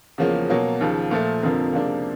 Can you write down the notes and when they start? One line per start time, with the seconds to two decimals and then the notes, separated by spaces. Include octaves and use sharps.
0.18 E2 C#3 F3 A#3 C#4
0.50 B2 F#3 A#3
0.81 D#2 C#3 F3
1.11 A#2 F3 A3
1.42 F1 F2 D3 F3 A#3
1.73 C#2 C3 F3 A#3 D4